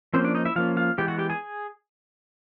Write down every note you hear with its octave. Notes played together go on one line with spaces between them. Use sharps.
F3 A#3 C4 C#4 C5
D4 D5
D#4 D#5
E4 E5
F3 A#3 C#4 F4 F5
F4 F5
E3 G#3 B3 G4 G5
F#4 F#5
G4 G5
G#4 G#5